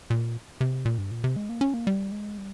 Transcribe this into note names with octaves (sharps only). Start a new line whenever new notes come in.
A#2
C3
A#2
G2
A#2
C3
G#3
A#3
C#4
A#3
G3
G#3
G3